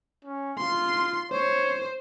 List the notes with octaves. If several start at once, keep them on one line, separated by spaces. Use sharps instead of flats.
C#4
F4 C6
C5 C#5